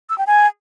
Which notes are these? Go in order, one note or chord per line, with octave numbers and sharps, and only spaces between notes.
E6
G5
G#5